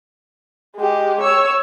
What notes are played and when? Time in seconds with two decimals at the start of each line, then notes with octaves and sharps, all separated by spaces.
0.76 G#3 G4
1.21 C#5 E6